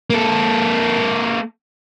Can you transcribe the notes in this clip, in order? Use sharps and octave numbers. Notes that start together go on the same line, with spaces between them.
A#3 A4